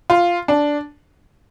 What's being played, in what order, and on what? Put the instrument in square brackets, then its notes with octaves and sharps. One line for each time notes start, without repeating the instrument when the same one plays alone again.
[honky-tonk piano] F4
D4